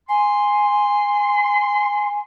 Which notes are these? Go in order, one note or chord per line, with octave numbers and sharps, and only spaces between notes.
G#5 C6